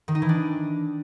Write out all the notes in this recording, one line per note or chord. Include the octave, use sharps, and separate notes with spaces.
D#3
D#4
E3
D4